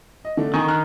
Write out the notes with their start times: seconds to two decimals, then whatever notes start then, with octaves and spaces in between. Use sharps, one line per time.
0.25 D#5
0.37 D3 A3 D4
0.54 D3 D#3 G#5 C#6
0.68 A#5 F6 F#6